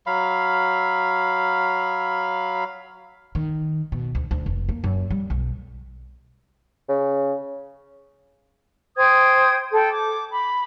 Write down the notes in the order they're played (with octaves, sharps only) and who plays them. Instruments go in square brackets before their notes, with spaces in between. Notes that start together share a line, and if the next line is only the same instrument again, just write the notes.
[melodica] F#3 F5 B5
[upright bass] D#3
B2
D2
D2
F1
A#3
F#2
G3
B1
[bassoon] C#3
[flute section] C5 G5 D#6 G#6
A4 G5
D6
B5